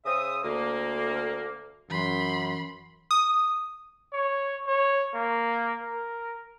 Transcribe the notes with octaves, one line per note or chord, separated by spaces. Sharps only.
C#3 G#4 C5 E5 D#6
D2 A#3
F#2 E3 B5 C6
D#6
C#5
C#5
A#3
A#4